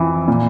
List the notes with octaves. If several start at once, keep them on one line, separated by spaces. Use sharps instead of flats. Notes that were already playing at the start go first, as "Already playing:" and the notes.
Already playing: F2 E3
A#2